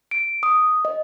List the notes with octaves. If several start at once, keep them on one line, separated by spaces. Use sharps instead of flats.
D7
D#6
D#5